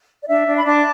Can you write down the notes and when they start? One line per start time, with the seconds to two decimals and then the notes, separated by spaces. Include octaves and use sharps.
0.23 D5
0.28 D4 E5
0.46 D4
0.56 B5
0.65 D4 A5 D6